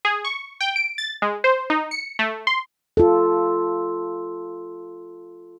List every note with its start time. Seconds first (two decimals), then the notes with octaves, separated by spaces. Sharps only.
0.05 G#4
0.25 C#6
0.61 G5
0.76 D7
0.98 A6
1.22 G#3
1.44 C5
1.70 D#4
1.91 C#7
2.19 A3
2.47 C6
2.97 F4 A4